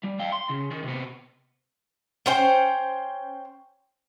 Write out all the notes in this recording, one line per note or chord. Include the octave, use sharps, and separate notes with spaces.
G3
F5 G5
C6
C#3
D#3
C3 B3
C#4 C5 G5